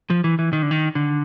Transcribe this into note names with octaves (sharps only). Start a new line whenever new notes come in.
F3
E3
E3
D#3
D3
D#3
D3